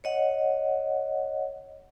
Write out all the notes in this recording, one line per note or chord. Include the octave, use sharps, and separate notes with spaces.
C#5 D#5 F#5